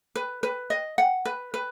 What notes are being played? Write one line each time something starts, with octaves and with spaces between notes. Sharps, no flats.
B4
B4
D#5
F#5
B4
B4